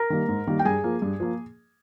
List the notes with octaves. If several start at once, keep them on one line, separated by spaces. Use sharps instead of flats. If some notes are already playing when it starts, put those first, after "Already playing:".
Already playing: A#4 A#5
D#3 G3 A#3
G#2
D#3 G3 A#3
G5
G2 G#4 G#5
F3 A#3
G2
F3 A#3